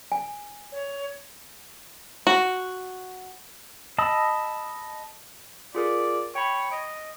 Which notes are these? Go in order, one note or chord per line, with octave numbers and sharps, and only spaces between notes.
G#5
C#5
F#4
D#5 A5 B5 D#6 E6
F4 G#4 A#4 D5
C#5 G5 B5
D#5 D7